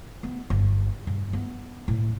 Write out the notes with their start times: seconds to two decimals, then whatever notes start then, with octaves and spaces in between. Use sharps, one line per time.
0.23 B3
0.50 G1
1.07 G2
1.33 B3
1.88 A2